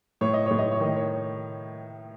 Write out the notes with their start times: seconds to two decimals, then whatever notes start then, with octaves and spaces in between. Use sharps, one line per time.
0.21 A2 C#5
0.34 D#5
0.46 A2 C#5
0.59 D#5
0.71 C#5
0.80 D#3 D#5
0.96 C#5